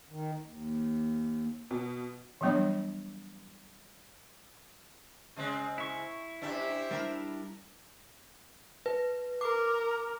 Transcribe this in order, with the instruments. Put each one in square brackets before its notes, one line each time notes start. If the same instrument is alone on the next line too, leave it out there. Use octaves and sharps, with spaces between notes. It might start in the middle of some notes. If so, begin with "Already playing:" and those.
[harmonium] D#3
D#2
[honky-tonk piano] B2
[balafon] E3 F#3 G3 B3 D4 C#5
[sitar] C#3 G#3 C4
[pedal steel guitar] E4 C#6
[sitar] G2 D4 [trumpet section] G4 C5 E5
[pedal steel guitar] G3 D4 E4 [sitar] A#4
[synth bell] B4
[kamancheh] A#4 [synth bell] D6